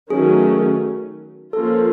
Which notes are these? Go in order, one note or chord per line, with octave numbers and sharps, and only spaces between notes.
D#3 F#3 A3 C#4 G#4
F3 A#3 C#4 F4 A4